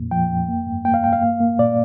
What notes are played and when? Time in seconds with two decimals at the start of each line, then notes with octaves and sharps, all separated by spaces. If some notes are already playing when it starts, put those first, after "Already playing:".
Already playing: F2 A#2 A#3
0.11 F3 G5
0.30 F2
0.48 A#3
0.67 G2
0.85 A#3 G5
0.94 F5
1.03 G2 G5
1.13 F5
1.21 A#3
1.40 A#3
1.59 A#2 D5